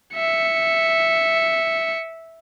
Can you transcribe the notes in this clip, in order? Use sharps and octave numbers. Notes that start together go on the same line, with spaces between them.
E5 C#7